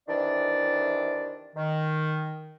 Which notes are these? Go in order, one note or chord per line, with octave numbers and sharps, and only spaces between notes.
C3 D#3 E3 D4 D5
D#3